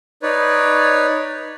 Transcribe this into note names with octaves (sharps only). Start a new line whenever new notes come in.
D#4 B4 C#5 D5